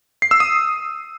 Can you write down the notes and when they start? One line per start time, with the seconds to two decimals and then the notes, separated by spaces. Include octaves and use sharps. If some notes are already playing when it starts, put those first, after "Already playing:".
0.22 C7
0.31 E6
0.40 D#6